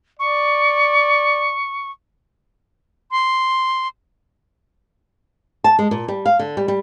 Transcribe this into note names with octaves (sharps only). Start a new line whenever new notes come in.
D5 C#6
C6
A5
G#3
A#2
G3
F5
D3
G3
G3